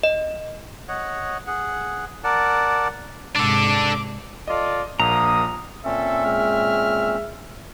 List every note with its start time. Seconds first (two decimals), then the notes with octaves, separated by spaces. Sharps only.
0.03 D#5
0.88 C#5 D#5 F#5
1.47 G#4 F#5
2.24 A#4 D5 F#5 A5
3.36 G#2 C3 D4 A4 D6
4.48 F4 A4 D5 D#5
5.00 A#1 A#3 A#5 D#6
5.85 A#2 C4 C#4 A4 E5
6.25 G#3 F6